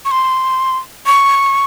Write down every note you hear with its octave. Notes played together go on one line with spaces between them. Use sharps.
C#6
C6
C#6